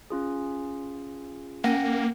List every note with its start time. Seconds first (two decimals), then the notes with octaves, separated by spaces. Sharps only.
0.10 C#4 F4 G#4
1.64 A#3 C#4 F#5 G5 A#6